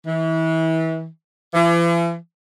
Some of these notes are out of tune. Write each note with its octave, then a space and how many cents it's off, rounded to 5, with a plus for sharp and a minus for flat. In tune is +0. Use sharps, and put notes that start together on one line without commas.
E3 -30
E3 +45